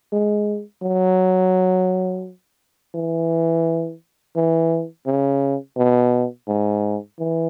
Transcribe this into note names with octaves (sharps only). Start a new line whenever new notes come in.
G#3
F#3
E3
E3
C#3
B2
G#2
E3